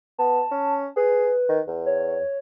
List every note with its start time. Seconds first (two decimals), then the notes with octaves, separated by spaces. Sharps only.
0.19 B3 A5
0.51 C#4
0.96 G#4 B4
1.49 D#3
1.67 E2
1.86 C#5